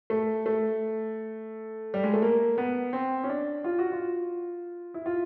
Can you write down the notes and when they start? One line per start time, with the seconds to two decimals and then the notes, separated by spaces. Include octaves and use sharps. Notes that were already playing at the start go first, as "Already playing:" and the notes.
0.10 A3
0.46 A3
1.94 G3
2.04 G#3
2.13 A3
2.22 A#3
2.58 B3
2.93 C4
3.24 C#4
3.29 D4
3.64 F4
3.78 F#4
3.92 F4
4.94 E4
5.06 F4